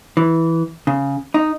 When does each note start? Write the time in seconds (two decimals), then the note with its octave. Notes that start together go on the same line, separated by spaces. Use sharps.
0.17 E3
0.87 C#3
1.34 D#4